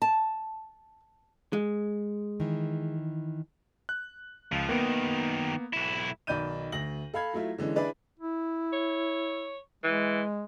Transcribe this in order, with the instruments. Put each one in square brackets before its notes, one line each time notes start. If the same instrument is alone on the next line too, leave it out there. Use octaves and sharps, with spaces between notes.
[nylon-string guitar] A5
[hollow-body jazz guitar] G#3
[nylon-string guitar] D#3 E3
[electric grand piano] F#6
[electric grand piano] C#2 [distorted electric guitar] F3
[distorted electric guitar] F#2 D#3 [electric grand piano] A#3 B3
[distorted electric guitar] B1 E4
[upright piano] B1 D#3 D5 B5 G6 D#7
D2 A#6 F#7
A4 F5 B5 G#6
F#3 A3 E4 F4
D3 E3 G#3 C#4
D4 E4 G#4 B4 D5
[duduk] E4
[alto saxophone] C#5
[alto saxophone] E3 [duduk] G#3